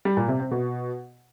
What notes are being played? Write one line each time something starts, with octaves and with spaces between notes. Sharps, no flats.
G3
A#2
C3
C4
B2